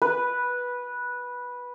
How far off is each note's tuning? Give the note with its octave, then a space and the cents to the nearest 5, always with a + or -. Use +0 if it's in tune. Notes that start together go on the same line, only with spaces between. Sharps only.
B4 -10